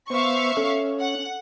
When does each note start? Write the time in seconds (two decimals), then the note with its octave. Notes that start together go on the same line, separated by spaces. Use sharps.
0.10 B3 C5 E5 F5 C#6
0.57 C#4 A4
1.00 F#5